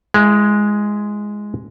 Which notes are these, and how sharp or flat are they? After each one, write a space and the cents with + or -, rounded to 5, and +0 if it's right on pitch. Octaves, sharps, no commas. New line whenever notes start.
G#3 +0 E4 +30